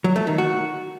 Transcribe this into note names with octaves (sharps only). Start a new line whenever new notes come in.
F#3
A3
D#3
F#4